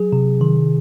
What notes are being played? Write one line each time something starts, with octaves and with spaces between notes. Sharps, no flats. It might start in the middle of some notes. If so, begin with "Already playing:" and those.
Already playing: F#3 G#4
C3
D#3